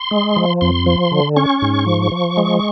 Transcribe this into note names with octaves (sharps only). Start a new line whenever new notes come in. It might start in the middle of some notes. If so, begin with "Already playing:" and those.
Already playing: C6
G#3
F3
F2 C6
F3
D3
C#4 C#6
G#2
F3
F3
G#3